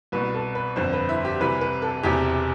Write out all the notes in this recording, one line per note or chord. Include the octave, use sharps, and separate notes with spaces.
C2 B2 B4
A4
B4
G1 F2 D3 C5
B4
E4
G4
C2 C3 E3 B4
B4
A4
E1 E2 C3 E3 G4